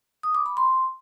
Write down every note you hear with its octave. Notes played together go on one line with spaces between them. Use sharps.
D#6
D6
B5
C6